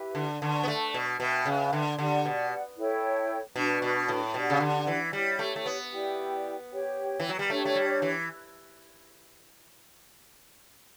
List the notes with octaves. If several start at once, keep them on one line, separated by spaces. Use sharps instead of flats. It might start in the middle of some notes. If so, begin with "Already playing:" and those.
Already playing: E4 G4 B4 E5
D3
D3 B4 D5 A5 C#6
B3
A3
B2
B2 B4 E5 G5
C#3
D3
D3 G4 D5 F#5
B2
E4 A4 C#5 G5
B2 D4 F#4 B4
B2
A2
B2 D4 G4 D5 F#5
C#3
D3
E3
G3 E4 G4 C#5
A3
A3
B3
E4 G4 D5 G5
G4 C#5 G5
E3
F#3
G3
A3 D4 G4 C#5
A3
G3
E3